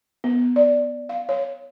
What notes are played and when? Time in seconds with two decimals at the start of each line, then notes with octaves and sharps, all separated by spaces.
0.24 B3
0.56 D5
1.09 F5
1.29 C#5